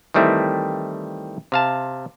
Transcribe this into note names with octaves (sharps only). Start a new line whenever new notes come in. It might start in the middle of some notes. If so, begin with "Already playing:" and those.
D#3 E3 G3 A3 C4 E4
C3 F5 A5